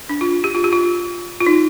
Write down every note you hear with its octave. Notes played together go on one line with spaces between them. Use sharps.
D4
F4
G4
F4
G4
F4
F4
D#4